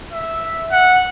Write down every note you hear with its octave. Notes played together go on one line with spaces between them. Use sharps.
E5
F#5